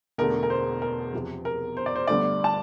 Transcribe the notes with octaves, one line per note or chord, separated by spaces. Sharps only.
E1 E2 D3 A3 A#4
A#4
C5
A#4
E2 C3 F3
A#4
C5
D5
C5
G1 G2 D3 A3 D4 D5
A5